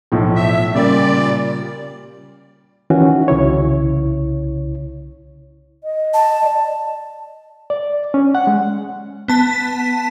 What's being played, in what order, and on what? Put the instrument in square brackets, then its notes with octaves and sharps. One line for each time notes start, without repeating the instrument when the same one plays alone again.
[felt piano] B1 A2 F3
[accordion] E5
[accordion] A#2 D5 [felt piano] C#3 G3 A#3
[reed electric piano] D#3 E3 C#4 F#4
C2 C#3 E4 C#5
[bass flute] D#5
[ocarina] A5
[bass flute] D5
[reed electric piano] D5
C#4
F#5
G#3
[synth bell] B3 A5 B6